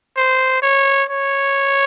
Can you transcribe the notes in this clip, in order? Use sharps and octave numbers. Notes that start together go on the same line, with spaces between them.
C5
C#5
C#5